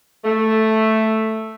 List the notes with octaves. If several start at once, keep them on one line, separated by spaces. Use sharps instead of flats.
A3